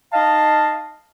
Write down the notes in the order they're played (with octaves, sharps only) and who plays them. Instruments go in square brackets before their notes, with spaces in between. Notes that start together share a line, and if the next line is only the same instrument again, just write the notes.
[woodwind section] D#4 D#5 F5 [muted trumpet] A5